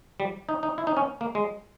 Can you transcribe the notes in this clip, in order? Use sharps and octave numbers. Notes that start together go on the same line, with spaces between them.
G3
D#4
D#4
E4
D#4
C#4
A#3
G#3